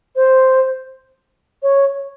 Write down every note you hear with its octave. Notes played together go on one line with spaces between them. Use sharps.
C5
C#5